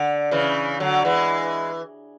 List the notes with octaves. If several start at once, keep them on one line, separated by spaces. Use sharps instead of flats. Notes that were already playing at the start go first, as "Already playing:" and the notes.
Already playing: D3
C#3 E3
D3 F#3
E3 G#3